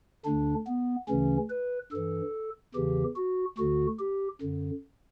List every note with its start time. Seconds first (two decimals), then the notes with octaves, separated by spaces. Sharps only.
0.25 D2 D3 D4
0.67 B3
1.08 D2 C#3 E3 C#4
1.50 B4
1.92 G2 E3 A4
2.74 E2 C#3 E3 G4
3.16 F#4
3.58 D2 D3 F#4
3.99 G4
4.41 F#2 D3